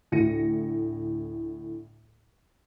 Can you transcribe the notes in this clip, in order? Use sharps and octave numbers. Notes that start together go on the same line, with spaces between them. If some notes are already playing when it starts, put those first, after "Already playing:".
D2 A2 A#6 C#7 D#7